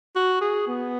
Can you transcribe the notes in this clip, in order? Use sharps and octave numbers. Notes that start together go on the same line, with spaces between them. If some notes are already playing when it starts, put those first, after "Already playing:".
F#4
G#4
B3